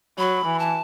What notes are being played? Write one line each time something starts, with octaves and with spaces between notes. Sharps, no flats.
F#3 B5
E3
A5